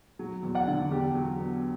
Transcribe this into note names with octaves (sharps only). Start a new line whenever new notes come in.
F#3
E2
D5 F#5
D3
E2 G4
F#3
B3